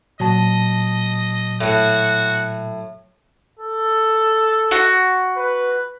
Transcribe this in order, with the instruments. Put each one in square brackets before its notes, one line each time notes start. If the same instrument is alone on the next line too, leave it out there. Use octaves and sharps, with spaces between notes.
[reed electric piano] A#2 A5 [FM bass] F#3 [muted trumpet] D#5
[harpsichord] A2 [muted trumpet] F#4
[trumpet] A4
[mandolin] F#4
[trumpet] B4